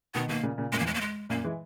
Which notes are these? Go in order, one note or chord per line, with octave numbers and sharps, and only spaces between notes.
B2 D#3 B3
B2 D#3 A#3
A#2 C#3
A#2 C#3
F#2 A#2 G#3
E2 A#3
G#3
A#3
G#3
F#2 A#2 A#3
E3 G#3